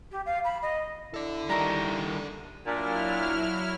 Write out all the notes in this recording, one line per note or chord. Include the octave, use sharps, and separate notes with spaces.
G4
F5
B5
D#5
E4 A4 D5
D#3 G3 F#4 D#5 A#5
A#2 F#3 D4 E4 F6